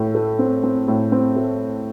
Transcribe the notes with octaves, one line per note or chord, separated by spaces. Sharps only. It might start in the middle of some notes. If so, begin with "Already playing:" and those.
Already playing: A2 A3
A3
C4
C4
A2
C4
A3